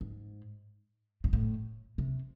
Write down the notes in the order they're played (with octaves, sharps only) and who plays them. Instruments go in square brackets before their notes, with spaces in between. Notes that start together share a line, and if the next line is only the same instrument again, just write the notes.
[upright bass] G#2
G#2
A2
C3